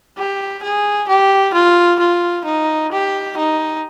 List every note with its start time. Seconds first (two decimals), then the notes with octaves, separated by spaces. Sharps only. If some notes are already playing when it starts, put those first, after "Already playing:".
0.18 G4
0.63 G#4
1.08 G4
1.54 F4
1.99 F4
2.45 D#4
2.92 G4
3.37 D#4